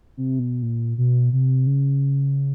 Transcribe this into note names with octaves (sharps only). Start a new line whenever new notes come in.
C3
B2
A#2
B2
C3
C#3